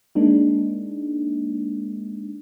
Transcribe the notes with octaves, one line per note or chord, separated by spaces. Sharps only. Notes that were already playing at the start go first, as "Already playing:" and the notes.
G#3 A#3 D4 D#4